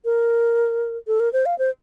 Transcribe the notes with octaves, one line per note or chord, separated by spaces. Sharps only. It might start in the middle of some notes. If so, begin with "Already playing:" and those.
A#4
A4
A#4
C5
F5
C5